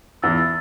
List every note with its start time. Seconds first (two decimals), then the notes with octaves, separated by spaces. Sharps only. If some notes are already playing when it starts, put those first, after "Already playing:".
0.22 E2 E6 A6
0.38 E6 A6